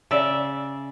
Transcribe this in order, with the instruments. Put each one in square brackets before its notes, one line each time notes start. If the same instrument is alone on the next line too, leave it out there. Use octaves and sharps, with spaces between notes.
[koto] C#3 D5 E5